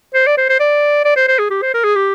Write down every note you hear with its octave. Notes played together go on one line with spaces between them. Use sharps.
C5
D5
C5
C5
D5
D5
C5
C5
G#4
G4
C5
A#4
G#4
G4